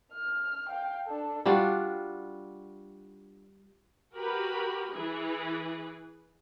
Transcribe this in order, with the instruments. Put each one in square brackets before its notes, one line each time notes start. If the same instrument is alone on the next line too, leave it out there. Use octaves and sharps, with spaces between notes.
[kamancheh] F6
F5 G5
D4 A4
[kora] G3 D4 F4 F#4
[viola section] F#4 G4 A#4 B4 B5
E3 G#4 B4